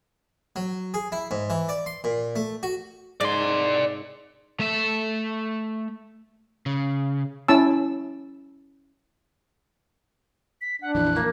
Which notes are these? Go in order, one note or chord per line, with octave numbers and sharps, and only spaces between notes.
F#3
G#4
E4
G#2
E3
D5
C6
A#2
A3
F#4
G#2 G#3 D5 G#5 C6
A3 E5
C#3
C#4 E4 A5 E6
B6
D4 F#5
A#1 F2 E3 F#6
A#3